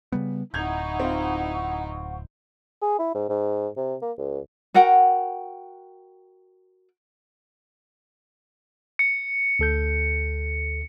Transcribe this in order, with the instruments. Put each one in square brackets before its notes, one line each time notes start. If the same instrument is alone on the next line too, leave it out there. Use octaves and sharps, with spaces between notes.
[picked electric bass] C#3 G3 B3
[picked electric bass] D1 [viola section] D#4 E4 [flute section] F#5 C#6 [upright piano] G6 G#6 F7
[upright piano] C4 F4
[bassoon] G#4
E4
G#2
G#2
C3
A#3
C#2
[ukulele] F#4 A#4 F#5 G5
[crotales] C#7
[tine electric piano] D2 A4 G6